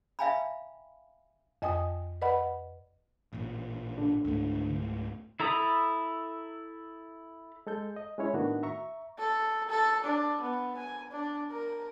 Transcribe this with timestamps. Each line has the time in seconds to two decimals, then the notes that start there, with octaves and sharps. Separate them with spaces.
0.19 E5 F5 G5 G#5 A#5 B5
1.62 F2 D#5 G5 G#5 D#6
2.22 B4 D5 D#5 F#5 B5
3.33 A1 A#2
3.98 D3
4.24 C#2 G#2 A3
5.40 E4 A4 A#5 B5 D#6
7.67 G#3 A4 G6
7.96 D#5
8.18 G#3 C#4 E4 C#5
8.33 A2 D#3 B3 D4 F#4
8.63 E5 A#5 C#6
9.19 A4
9.70 A4
10.04 D4
10.41 B3
10.77 G#5
11.11 D4
11.51 A#4